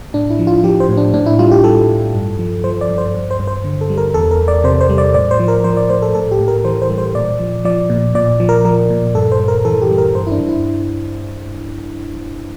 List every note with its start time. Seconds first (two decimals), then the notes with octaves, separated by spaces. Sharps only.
0.14 A2 D4
0.31 E4
0.39 F3
0.47 F4
0.63 F3 G4
0.80 C5
0.89 A2
0.97 D4
1.14 A2 D4
1.26 E4
1.39 G3 F4
1.51 G4
1.64 G3 A4
1.89 A2
2.14 G2
2.39 F3
2.64 F3 C5
2.81 D5
2.89 G2
2.98 C5
3.15 G2
3.31 C5
3.39 G2
3.47 C5
3.64 D3
3.81 A4
3.90 G3
3.98 A#4
4.14 E2 A4
4.31 A#4
4.40 E2
4.48 D5
4.64 C3 C5
4.81 C5
4.89 G3
4.98 D5
5.14 A2 D5
5.31 C5
5.39 F3
5.48 A#4
5.64 F3 C5
5.77 D5
5.90 A2 C5
6.02 A4
6.15 A2 A4
6.31 G4
6.40 A2
6.48 A#4
6.64 E3 C5
6.82 C5
6.90 G3
6.98 C5
7.15 A#2 D5
7.40 F3
7.65 F3 D5
7.90 A#2
8.15 A#2 D5
8.40 F3
8.49 A#4
8.65 F3 A#4
8.90 A#2
9.15 G2 A4
9.32 C5
9.40 G2
9.48 A#4
9.65 E3 A4
9.82 G4
9.91 G3
9.98 A#4
10.15 G2 C5
10.27 E4
10.32 D4
10.40 G2
10.49 E4